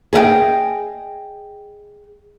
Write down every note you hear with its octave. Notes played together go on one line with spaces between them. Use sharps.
G#4 D#5 E5 G5